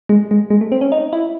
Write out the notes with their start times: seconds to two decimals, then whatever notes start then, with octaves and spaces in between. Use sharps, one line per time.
0.09 G#3
0.31 G#3
0.50 G#3
0.61 A3
0.72 C4
0.81 C#4
0.92 D#4
1.13 E4